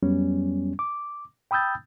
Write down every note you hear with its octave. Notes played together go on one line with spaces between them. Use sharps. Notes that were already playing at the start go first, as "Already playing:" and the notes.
F2 F#3 G3 B3 C#4
D6
G5 B5 D#6 E6 G6 A6